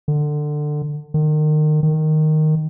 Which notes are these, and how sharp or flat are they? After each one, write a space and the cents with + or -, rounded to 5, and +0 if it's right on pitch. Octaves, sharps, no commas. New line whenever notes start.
D3 +20
D#3 -30
D#3 -5